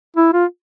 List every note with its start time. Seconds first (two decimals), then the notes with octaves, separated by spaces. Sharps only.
0.16 E4
0.33 F4